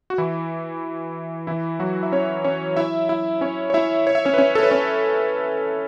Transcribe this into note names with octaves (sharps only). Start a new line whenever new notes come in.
F#4
E3 E4
E3 E4
F#3 F#4
E5
C#4 C#5
C#4 C#5
E4 E5
E4 E5
C#4 C#5
C#5
E4 E5
C#5
E5
C#4 C#5
B4
C#4 C#5
A4
B4
C#4 C#5